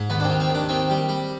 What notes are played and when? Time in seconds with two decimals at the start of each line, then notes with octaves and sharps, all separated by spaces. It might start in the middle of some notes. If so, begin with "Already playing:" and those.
Already playing: G#2
0.10 D#2 B3
0.20 D4
0.24 C4
0.30 D#3
0.40 C4
0.50 D#2 D4
0.69 D#3 C4
0.90 G3
1.09 G3